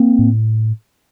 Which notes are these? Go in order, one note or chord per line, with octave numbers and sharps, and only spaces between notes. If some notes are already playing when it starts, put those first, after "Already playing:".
Already playing: A#3 C4
A2